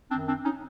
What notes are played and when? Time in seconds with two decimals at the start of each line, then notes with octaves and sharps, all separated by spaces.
0.10 F#2 D#3 C4 D4
0.28 C4 D4
0.44 C#4 D#4